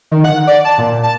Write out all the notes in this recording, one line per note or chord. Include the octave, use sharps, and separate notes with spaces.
D#3
F#5
D5
A5
A#2
A5